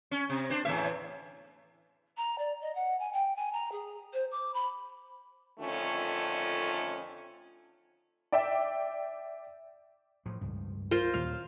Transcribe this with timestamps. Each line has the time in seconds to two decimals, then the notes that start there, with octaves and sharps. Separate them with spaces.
0.11 C#4
0.29 C3
0.50 D4 C5
0.65 E2 A2 E5
2.17 A#5
2.38 D5
2.61 D#5
2.75 F#5
2.99 G#5
3.13 G5
3.36 G#5
3.52 A#5
3.71 G#4
4.13 C5
4.31 D6
4.54 B5
5.60 F2 D3 D#3 A3 C#4 F4
8.32 D5 E5 G5
10.26 A2 F3
10.41 C#2 G2
10.91 F4 A#4 C5
11.14 D#2 A#2 G3 F5